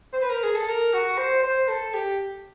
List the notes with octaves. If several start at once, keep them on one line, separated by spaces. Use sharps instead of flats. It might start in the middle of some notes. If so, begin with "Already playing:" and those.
C5
B4
A#4
G#4
A4
A#4
F#4
C5
C5
A4
G4